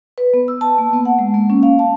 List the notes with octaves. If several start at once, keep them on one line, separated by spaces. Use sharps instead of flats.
B4
B3
E6
A5
A#3
B3
F#5
G#3
A#3
C#4
F5
A5